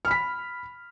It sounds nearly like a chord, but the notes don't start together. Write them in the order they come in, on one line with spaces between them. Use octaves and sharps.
F6 B5 B6